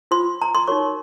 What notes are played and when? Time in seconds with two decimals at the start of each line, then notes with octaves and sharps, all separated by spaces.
0.11 F4 C5 C6
0.42 A#5
0.55 C6
0.67 D#4 F#4 A#4 C#5 C#6